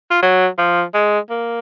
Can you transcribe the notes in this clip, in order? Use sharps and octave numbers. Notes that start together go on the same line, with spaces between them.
F4
F#3
F3
G#3
A#3